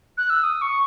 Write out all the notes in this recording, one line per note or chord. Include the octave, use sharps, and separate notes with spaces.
F#6
E6
D#6
C#6